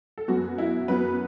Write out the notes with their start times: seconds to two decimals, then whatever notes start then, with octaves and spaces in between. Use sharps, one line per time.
0.18 A4
0.28 F#2 F#3 B3 F#4
0.58 E4
0.88 F#2 F#3 B3 B4